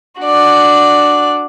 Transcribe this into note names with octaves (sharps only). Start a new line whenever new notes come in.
D4 F#4 D5